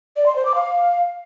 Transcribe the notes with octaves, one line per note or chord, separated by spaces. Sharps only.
D5
C6
C5
D6
F5